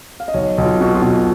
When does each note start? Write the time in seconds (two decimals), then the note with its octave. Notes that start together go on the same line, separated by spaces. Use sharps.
0.20 F5
0.28 D#5
0.34 B1 C#5
0.58 B1
0.65 F4
0.81 B2
0.95 F4
1.02 B2